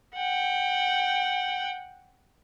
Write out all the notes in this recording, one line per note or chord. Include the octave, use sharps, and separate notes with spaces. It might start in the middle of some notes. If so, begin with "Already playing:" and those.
F#5 G5